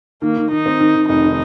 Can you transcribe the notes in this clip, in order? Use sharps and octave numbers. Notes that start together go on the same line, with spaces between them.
D#3 A#3
D#3
D#3 D#4
C4
D#3
D#3
F1 D#4
D#3